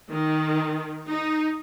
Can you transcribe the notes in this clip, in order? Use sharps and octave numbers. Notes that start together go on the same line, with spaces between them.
D#3
D#4